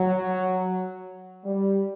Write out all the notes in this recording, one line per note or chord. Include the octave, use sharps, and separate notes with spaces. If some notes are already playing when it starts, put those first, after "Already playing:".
Already playing: F#3
G3